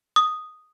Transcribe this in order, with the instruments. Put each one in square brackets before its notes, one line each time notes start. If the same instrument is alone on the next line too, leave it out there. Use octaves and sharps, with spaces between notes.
[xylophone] D#6